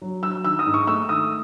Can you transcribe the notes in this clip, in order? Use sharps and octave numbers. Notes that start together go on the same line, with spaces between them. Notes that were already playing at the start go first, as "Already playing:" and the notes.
F#3
F#3 E6
D#3 E6
D#6
G#2
C#6
A3 E6
D#3 D#6